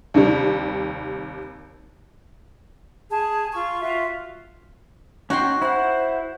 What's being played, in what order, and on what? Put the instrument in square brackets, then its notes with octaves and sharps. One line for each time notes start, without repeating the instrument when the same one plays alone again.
[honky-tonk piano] D#2 C3 G3
[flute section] G#4 A5
F4 C#6
F4 F#4 E5
[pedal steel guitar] C#4 D#4 G5 [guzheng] F#4 C6
[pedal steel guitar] E4 F#5 [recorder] C5